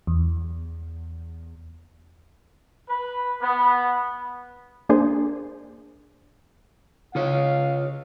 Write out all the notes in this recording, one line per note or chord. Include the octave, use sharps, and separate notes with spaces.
E2
B4
B3
A#3 D4 G#4 C5
C#3 F4 G#4 C#5 F5